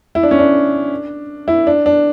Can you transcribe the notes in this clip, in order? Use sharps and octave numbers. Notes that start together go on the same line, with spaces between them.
E4
D4
C#4
D4
E4
D4
D4